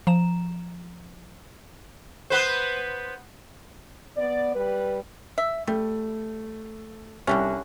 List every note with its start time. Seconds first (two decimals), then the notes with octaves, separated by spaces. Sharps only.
0.07 F3 A#5 E7
2.30 B3 B4 C5
4.17 B3 D5
4.55 G3 B4
5.38 E5
5.67 G3 A3
7.27 C2 D3 G3 C#4